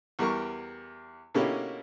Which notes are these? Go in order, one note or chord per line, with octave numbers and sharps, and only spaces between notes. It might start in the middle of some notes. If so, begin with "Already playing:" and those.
E2 G3 A#4 A#5 C#6
B2 D3 A#3 C#4 E4 G4